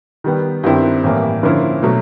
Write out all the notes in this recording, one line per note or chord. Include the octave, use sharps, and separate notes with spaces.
D#3 G3 B3
G2 D#3 G3 C4 E4
A2 E3 G3 A#3
D3 F3 A#3 C#4 E4
B2 F#3 A3